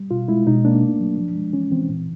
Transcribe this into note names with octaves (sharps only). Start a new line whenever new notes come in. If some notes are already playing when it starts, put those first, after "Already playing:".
Already playing: G3
B2 F4
G#3 E4
B2 D#4
A#3 D4
A3
F#3
F3
G#3
E3 C#4
E3 C4
A#2